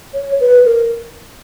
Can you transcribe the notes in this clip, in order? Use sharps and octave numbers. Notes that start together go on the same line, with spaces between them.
C#5
B4
A#4